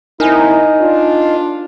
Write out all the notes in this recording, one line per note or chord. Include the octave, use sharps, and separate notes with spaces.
D#2 C4 D#4 E4 A#4 G#5
D4 F4